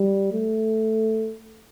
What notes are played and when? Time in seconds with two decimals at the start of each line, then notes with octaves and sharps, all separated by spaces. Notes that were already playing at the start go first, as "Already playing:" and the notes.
Already playing: G3
0.33 A3